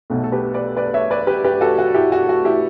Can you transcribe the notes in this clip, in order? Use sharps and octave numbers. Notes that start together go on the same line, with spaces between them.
B1 B2 A3
A4
G4 B4
B4 D5
B4 D5
C#5 E5
B4 D5
G4 B4
G4 B4
F#4 A4
F#4
E4 G4
F#4
F#4
E4 G4